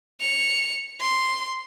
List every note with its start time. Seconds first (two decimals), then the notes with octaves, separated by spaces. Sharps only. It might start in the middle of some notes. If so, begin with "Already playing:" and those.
0.21 C#7 F7
1.00 C6